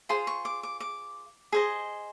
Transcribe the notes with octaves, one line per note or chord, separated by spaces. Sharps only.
F4 G#4 C5 C6
C#6
D6
D6
D6
G#4 C5 D#5